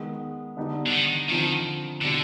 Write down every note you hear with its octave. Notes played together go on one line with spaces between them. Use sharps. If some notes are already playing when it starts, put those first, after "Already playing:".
Already playing: D#3 G#3 B3
D3 G3 B3 D#4
D3
D#3
D3 D#3 F3 C4 D#4
B2 D3 G3 D4